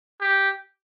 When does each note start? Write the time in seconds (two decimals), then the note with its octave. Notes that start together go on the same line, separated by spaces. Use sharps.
0.21 G4